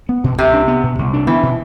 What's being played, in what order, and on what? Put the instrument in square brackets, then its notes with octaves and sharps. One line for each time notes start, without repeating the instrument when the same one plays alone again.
[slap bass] B3
B2
[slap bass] C2 [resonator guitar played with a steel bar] C3
[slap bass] D4
B3
B2
C2
D4
[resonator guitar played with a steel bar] E3 [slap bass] B3
[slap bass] B2